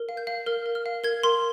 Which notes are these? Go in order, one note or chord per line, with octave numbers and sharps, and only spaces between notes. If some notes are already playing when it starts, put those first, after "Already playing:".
Already playing: A#4
F5
G6
F5
A#4 F6
A#4
F6
F5
A#4 G#6
A#4 C6